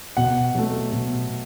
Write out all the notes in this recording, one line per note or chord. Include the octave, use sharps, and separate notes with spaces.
B2 F#5
F#3 A3
B2